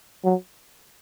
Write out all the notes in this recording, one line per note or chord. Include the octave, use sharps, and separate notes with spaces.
F#3